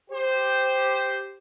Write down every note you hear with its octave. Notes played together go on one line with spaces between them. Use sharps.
G4 C5